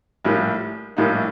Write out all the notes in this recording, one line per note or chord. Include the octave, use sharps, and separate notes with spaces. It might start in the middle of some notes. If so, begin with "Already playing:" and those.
A#1 A2 G3 A#3
A#1 A2 G3 A#3 D#4